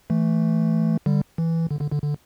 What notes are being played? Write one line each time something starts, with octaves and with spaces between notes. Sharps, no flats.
E3 A3
D3 G3
E3
D3
D3
D3
D3